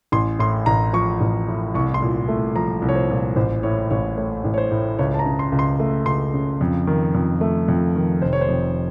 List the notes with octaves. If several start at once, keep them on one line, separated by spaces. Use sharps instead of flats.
A1 C6
A2 C6
A1 A#5
F3 C#6
A1
A2
C2 C#6
C6
A#2
A3
F3 A#5
C2
C#5
C5
A#2
A1 C5
A2 C#5
A1 C#5
A3 C#5
A1
C#5
C5
A2
C#2 C#5
A5
A#5
C#3
C6
C#2
C6
A3
C#2 C6
C#3
F2
D#3
F2
A3
F2
D#3
F1 C5
C#5
C5
F2